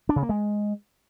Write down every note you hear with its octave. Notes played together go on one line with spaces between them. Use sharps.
D4
C#3
A#3
G#3